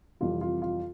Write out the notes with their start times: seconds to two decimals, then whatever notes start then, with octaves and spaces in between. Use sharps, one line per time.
0.20 F2 C3 E3 G3 F4
0.41 F4
0.62 F4